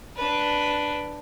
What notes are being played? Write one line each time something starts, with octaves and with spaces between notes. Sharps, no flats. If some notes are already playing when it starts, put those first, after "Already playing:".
D4 B4